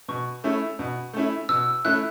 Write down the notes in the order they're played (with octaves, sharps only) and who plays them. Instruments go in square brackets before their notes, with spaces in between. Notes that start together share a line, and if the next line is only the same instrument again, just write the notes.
[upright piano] B2 [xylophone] C#6
[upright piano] A3 C#4 E4
B2
A3 C#4 E4
[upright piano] B2 [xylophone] E6
[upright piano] A3 C#4 E4 [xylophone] F#6